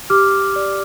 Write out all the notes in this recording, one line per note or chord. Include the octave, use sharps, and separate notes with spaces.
G4 D6 F6
D5